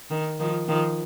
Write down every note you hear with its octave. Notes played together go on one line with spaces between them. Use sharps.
D#3
D#3 F3
D#3 F3